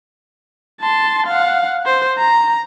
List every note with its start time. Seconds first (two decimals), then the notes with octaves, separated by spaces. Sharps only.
0.81 A5 C6
1.27 F5 F#5
1.86 C5
2.18 A#5